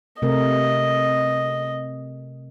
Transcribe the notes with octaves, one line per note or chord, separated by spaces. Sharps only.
C3 A3 A#4 D#5